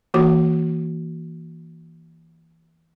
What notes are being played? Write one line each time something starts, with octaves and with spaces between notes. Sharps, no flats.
E3 A#3 F#4 D6